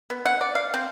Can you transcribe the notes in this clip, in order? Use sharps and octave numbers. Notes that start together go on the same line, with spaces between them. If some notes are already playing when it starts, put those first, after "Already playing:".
B3
F#5
D5
F5
C4